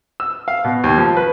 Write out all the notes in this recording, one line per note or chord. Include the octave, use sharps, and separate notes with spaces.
E6
F5
B2
D#2
F3
B4